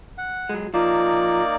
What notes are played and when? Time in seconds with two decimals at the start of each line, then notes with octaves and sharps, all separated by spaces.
0.18 F#5
0.49 F#3 G#3
0.74 F3 A#3 D#4 D5